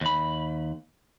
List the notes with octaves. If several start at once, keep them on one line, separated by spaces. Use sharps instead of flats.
D#2 B5